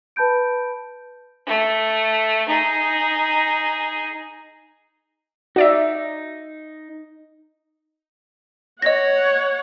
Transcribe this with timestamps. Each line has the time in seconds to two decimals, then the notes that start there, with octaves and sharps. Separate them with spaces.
0.16 B4 A5 B5 G6 D7
1.47 A3
2.48 D#4 G#4
5.56 D#4 F#4 D5 E5
8.82 C#5 D#5 F#5 A#6